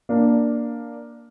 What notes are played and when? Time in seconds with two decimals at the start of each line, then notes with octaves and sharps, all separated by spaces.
0.09 A#3 D4